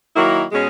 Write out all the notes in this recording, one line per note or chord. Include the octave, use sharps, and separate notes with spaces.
D#3 F#3 A#3 E4
B2 G#3 C#4 G#4